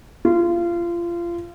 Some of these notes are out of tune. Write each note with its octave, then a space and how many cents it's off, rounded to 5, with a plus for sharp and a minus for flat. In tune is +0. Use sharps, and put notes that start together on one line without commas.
F4 -25